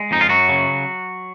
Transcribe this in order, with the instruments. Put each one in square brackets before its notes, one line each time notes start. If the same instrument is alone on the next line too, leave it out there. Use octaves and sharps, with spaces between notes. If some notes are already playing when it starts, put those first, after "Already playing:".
Already playing: [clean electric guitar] G#3
F2 D#4
F4
F#2 F#3 F#4
C#3